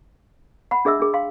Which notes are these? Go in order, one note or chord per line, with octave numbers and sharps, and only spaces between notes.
F#5 B5
D4 G#4 D#5 E5 E6
D4 G#4
F5 G5 C6